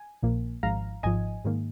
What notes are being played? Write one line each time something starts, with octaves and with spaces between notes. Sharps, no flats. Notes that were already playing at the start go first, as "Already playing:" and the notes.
Already playing: G#5
A#1 A#2 F3 A#3
G#1 G#2 F3 F5 A#5
G#1 G#2 F3 D#5 G#5
G#2 D#3 A#3